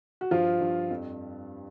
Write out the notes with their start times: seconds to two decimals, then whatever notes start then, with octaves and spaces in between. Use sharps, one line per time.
0.21 F#4
0.31 G2 F3 F4
0.60 G2
0.91 F2